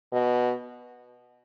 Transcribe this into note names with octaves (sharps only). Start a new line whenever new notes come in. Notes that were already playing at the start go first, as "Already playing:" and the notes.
B2